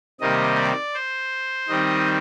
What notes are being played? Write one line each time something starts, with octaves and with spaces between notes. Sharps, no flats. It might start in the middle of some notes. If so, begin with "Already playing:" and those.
C3 D#3 G3 A#3 D#5
D5
C5
D#3 G3 C4 D#5